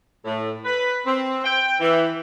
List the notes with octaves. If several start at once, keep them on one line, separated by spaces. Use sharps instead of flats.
A2
B4
C4
G5
E3